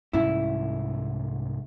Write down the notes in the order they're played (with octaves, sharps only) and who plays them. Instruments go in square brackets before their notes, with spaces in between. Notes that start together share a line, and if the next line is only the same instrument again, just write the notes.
[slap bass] C2 G#2 C#4 [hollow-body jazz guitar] E4